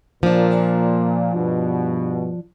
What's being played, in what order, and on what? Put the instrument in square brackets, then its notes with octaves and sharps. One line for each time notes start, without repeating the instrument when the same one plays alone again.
[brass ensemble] A#2 [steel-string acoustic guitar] F3 D4
[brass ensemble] G2 B2